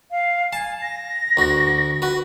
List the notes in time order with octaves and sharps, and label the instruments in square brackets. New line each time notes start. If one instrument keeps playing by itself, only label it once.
[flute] F5
[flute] G#5 [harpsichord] A5
[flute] A#6
[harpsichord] D2 F#4
F#4 B4